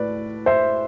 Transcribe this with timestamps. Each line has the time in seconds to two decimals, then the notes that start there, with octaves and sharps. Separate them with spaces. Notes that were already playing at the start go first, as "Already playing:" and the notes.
Already playing: A2 B4 D5
0.46 C5 E5